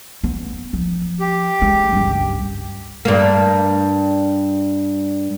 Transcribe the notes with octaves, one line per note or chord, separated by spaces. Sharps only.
B3
F3
G4
G#3
C#2 G2
G2 A#3